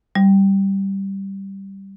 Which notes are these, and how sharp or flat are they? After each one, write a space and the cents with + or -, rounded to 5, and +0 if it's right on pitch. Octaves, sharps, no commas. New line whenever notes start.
G3 -5